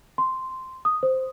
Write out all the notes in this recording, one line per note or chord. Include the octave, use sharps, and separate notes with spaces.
C6
D#6
C5